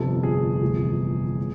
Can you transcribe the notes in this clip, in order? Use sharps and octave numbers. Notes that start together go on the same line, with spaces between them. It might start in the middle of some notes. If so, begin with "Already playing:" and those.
Already playing: G1 F2 C3 A4
G#4
G1 F2 C3 E3 A3
A2